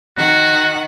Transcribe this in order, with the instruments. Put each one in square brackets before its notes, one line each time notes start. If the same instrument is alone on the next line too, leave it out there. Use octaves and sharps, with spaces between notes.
[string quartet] D#3 F#5 [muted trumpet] F#4